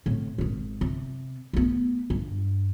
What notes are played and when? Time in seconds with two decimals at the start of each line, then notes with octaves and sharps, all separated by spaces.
0.06 A2 C3
0.38 G#1 G#2
0.81 C3
1.53 A3 B3
2.10 G2